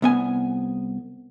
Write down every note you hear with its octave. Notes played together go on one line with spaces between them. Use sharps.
C2 B3 G#5